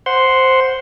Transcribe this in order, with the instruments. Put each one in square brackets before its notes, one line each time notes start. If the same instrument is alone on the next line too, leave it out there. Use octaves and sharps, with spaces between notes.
[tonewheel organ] C5 F#5 C6